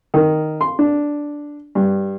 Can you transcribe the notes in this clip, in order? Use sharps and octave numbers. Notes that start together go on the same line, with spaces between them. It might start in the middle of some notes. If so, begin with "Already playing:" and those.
D#3
C6
D4
G2